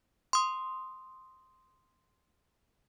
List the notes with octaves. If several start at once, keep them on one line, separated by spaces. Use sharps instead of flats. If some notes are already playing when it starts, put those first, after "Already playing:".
C6 D#6